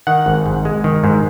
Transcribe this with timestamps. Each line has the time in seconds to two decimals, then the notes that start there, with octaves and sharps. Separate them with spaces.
0.07 D#3 F#5
0.26 G#1
0.46 G#2
0.65 G#3
0.84 D#3
1.04 G#2